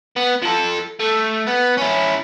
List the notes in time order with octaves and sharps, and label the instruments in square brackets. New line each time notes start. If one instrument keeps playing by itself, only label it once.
[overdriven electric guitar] B3
F3 A4
A3
B3
C#4 E4